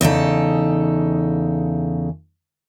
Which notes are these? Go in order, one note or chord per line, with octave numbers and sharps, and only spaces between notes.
E2 C#3 D#4 A4